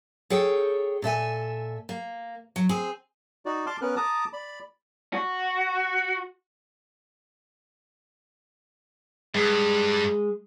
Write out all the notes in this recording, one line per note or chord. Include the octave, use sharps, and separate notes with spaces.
G#4 A4 C#5 G5
A#2 A4 E5 G#5
A#3
F#3
C4 G#4
D#4 F#4 D5
A5 C6 D6 F6
B3 C#4 A#4 B4 F6 F#6
A5 A#5 D6 D#6
D5 B5
F#4
G2 G#3